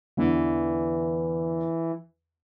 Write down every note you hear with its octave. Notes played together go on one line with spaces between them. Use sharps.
E2 D3 E3